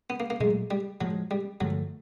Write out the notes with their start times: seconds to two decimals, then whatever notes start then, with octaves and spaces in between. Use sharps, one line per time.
0.10 B3
0.20 A#3
0.30 A#3
0.40 A#2 F#3 G#3 A3
0.71 G3
1.01 A2 F3 F#3 G#3
1.31 G3
1.61 G2 D3 F3 F#3 A3